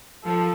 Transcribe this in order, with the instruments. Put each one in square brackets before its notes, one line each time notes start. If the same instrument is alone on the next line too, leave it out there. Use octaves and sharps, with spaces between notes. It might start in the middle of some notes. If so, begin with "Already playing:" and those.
[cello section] F3 [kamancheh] A4